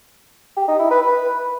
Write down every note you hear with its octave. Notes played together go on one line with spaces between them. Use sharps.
G4
D#4
E4
B4
B4